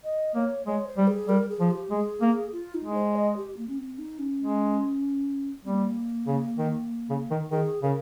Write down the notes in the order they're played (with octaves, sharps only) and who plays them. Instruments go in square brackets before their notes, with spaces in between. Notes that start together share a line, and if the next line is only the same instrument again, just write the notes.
[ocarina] D#5
[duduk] A#3 [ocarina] C#5
[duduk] G#3 [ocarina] C#5
[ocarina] C5
[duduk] G3
[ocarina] G#4
[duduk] G3 [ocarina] A#4
[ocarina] G#4
[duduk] F3
[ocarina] G4
[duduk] G#3 [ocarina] G#4
[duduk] A#3
[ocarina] F4
D#4
[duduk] G#3
[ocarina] C5
D#5
G4
A#3
C#4
C4
D#4
C#4
[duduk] G#3
[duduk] G3 [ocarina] C4
[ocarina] A#3
[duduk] C#3
D#3
C#3
D#3
[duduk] D#3 [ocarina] G#4
[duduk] C#3 [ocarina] A#4